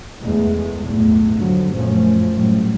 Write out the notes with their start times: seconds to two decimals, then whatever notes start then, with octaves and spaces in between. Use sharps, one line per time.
0.23 E2 G2 G#3 A3
0.81 B1 E2 A2 A3 B3
1.33 G2 D3 F3 F#3
1.74 F#2 A#2 F3 A3 C#4
2.32 A2 F#3 G3